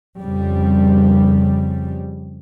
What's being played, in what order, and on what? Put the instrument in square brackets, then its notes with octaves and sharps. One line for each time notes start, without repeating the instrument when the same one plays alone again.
[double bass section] F2 C#3 G3